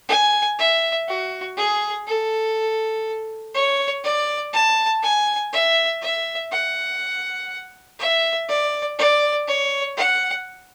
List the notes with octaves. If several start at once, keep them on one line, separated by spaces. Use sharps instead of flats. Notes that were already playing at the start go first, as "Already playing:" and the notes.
G#5
E5
F#4
G#4
A4
C#5
D5
A5
G#5
E5
E5
F#5
E5
D5
D5
C#5
F#5